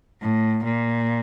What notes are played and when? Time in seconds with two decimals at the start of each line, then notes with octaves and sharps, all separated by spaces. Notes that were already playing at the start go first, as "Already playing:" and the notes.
0.22 A2
0.64 A#2